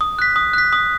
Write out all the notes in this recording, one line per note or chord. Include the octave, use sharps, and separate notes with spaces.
D#6
F#6 B6
D#6
F#6 B6
D#6